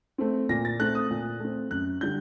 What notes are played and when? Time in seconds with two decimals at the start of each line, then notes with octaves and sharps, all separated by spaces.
0.18 A3 C4
0.49 A#2 A#6
0.65 A6
0.79 A3 C4 F#6
0.95 D#6
1.10 A#2
1.40 A3 C4
1.71 F#2 F#6
2.01 D3 G3 G6